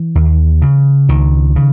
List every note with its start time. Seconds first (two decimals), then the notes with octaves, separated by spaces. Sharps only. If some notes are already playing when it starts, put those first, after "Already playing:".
Already playing: E3
0.15 D#2
0.62 C#3
1.09 C#2 D#3
1.56 C#3